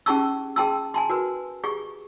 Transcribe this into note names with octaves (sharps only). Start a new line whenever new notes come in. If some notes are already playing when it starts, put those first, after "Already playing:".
C#4 G4 G#4 A5 C#6 E6
G#4 G5 A5 C6 E6
G#5 A5 C6
F#4 A#4 B4
G4 G#4 C#6